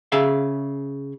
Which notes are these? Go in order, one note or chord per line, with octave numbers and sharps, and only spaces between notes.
C#3 G#4 E5 F5